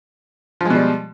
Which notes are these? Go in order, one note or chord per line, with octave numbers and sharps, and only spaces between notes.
B2 F3 G3 G#3